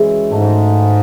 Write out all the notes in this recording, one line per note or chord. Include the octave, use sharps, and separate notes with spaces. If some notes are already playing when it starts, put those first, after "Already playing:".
Already playing: F#2 C#3 E3 G#3
G#2 D#3 A3 D#4